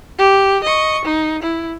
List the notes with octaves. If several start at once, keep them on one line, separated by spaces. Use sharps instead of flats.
G4
D#5 C#6
D#4
E4